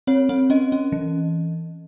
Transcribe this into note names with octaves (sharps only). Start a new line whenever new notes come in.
C4 C#5
C4
C#4 D#5
C#4
E3